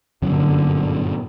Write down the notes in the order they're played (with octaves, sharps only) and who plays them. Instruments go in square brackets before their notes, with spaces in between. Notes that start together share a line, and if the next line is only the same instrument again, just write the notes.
[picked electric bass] G1 F#2 F#3 [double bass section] A#2 D3